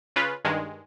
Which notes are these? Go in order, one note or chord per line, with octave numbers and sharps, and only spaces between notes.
C#3 F4 B4
G2 D#3 G#3